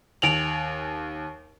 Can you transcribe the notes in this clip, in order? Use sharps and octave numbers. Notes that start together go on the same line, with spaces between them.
D#2 G#5 D7 F7 F#7